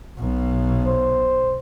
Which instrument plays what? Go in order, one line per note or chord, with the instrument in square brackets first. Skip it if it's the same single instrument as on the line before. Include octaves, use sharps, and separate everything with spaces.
[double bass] B1 B2
[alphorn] C5